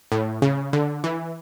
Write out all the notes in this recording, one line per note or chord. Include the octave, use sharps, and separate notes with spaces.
A2
C#3
D3
E3